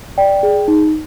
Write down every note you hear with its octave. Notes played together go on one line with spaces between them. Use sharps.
D5 G5
G#4
D#4